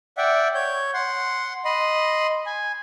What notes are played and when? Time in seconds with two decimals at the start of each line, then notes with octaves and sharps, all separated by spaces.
0.17 D5 E5 F#5 G5
0.54 C#5 G6
0.94 F#5 C6
1.65 D#5 B5 C6
2.46 G#5